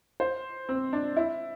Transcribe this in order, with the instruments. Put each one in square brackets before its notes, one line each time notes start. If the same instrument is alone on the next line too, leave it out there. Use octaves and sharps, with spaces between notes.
[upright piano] C5
C4
D4
E4